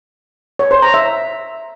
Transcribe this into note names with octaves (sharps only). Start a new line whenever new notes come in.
C#5
C5
A#5
E5